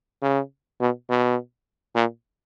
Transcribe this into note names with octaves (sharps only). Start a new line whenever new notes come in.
C#3
B2
B2
A#2